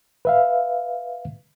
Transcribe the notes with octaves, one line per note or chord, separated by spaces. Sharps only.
B4 E5 F5